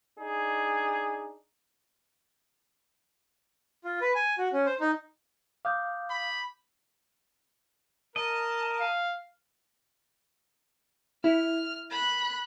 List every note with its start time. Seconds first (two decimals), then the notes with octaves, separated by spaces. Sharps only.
0.18 D4 D#4 G#4
3.84 F4
4.01 B4
4.15 G#5
4.38 F#4
4.53 C#4
4.66 C5
4.80 D#4
5.65 F5 D6 D#6 G6
6.10 B5
8.16 A#4 D#5 A5
8.80 F5
11.24 E4 F6
11.91 B5 F#6